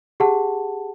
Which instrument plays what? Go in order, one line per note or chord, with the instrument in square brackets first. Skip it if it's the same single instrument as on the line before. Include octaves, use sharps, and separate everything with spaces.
[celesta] G4 G#4 F#5 A5